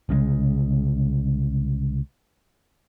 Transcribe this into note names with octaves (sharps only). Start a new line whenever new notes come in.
C2 C#3 F3 G#3